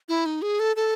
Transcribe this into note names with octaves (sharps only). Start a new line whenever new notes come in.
E4
D#4
G#4
A4
A4